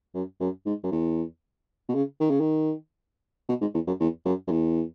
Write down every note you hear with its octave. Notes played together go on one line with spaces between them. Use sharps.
F#2
F#2
G#2
F#2
E2
B2
C#3
D#3
C#3
D#3
B2
G#2
E2
F#2
E2
F#2
F#2
E2